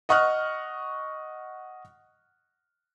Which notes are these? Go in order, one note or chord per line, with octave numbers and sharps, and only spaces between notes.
D#5 F#5 C#6 D#6 F6 F#6